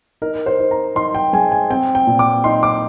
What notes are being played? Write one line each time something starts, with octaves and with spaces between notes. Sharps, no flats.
D#4 A#4
C5
D#4
A#5
D#4 C6
G5
G#3 G#5
G#5
C4 G5
G5
A#2
D6
D#4 C6
D6